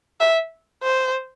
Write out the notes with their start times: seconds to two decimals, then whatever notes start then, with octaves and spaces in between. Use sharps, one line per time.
0.20 E5
0.83 C5